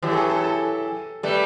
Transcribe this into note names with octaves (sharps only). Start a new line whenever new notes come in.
E3 F#3 G4
A4
G#4
A4
A4
G3 A3 B4